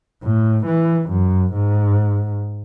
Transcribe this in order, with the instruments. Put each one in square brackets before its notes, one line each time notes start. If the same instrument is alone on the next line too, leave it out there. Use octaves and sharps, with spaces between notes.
[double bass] A2
E3
F#2
G#2